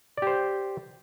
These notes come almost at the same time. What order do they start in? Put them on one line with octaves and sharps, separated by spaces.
D5 G4 C5